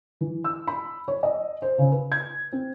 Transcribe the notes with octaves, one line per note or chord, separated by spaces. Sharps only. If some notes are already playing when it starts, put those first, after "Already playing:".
E3
E6
B5
C#5
D#5
C5
C#3
B4
G#6
C4